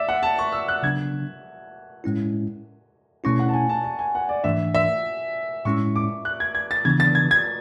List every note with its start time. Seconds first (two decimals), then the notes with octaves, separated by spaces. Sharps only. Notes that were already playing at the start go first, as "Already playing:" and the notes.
Already playing: D5 E5
0.09 F#5
0.23 A5
0.39 C#6
0.52 E6
0.68 F#6
0.83 C#3 F#3 B3 D4 G#6
2.04 A2 G#3 C#4 E4
3.24 B2 A3 C#4 E4 C#6
3.39 F#5
3.49 A5
3.54 G#5
3.69 A5
3.84 A5
3.99 G#5
4.15 F#5
4.29 D5
4.44 G#2 E3 A3 D4 E5
4.74 E5
5.65 A2 G#3 C#4 E4 C#6
5.96 D6
6.25 F#6
6.40 G#6
6.55 G#6
6.71 A6
6.85 C#3 E3 B3 D4 G#6
7.00 A6
7.15 G#6
7.31 G#6